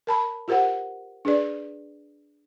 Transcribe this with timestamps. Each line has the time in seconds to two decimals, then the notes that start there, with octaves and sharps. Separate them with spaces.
0.07 A#4 A5 B5
0.48 F4 G4 A#4 C5 F#5
1.25 D4 G#4 B4 D5